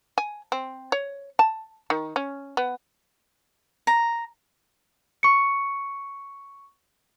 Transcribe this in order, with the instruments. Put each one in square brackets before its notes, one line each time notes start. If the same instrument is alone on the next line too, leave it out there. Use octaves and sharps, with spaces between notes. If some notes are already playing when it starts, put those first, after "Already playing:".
[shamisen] G#5
C4
C#5
A5
D#3
C#4
B3
[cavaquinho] A#5
[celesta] C#6 C#7